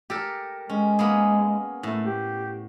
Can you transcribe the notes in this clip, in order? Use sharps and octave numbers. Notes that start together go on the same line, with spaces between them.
G4 A4 A#4
G#3 C#4
A#3 B3 G#4
A2 A3
G4